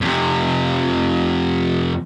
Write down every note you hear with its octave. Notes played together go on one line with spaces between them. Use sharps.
F2 C3